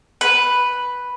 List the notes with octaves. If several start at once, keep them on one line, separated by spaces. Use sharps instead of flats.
B4